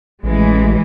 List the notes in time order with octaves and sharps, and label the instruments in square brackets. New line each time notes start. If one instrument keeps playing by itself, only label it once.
[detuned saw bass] A1 [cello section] E3 G#3